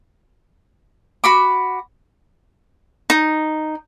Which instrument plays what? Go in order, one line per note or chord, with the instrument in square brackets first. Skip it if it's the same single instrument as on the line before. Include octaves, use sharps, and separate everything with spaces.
[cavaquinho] F#4 B5 D6
D#4